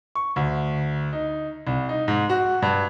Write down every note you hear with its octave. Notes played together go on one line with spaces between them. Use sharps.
C#6
D2
D#4
C2
D#4
G#2
F#4
G2